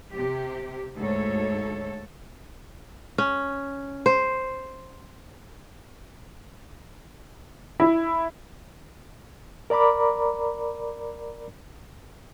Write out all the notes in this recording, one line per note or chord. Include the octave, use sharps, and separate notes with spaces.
C3 G4
D2 G#2 A4 C#5
C#4
C5
E4
A#4 D5 A#5 B5 D6